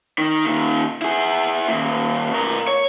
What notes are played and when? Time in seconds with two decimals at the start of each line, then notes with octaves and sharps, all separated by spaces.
0.18 D#3
0.45 A#2 D#3
1.02 E4 G#4
1.68 D#2 A#2
2.31 B2 A#4
2.68 C#5